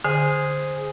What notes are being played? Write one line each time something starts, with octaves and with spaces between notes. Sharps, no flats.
D3 G#4 C5